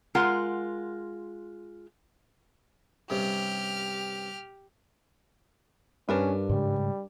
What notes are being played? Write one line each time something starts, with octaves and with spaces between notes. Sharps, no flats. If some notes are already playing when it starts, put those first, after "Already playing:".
G#3 F4 A#4 F#5
G2 C3 C#4 G4 F6
G2 C#4 D4 A#4 B4
G#2 C#3 G3 G#3